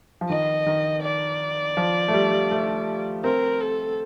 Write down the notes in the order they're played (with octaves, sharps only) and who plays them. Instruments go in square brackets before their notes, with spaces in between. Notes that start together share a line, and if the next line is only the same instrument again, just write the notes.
[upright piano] F3
[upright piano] D#3 [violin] D#5
[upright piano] D#3
[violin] D5
[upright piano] F3
A3
G3
G3
A3
[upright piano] C4 [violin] A#4
[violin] A4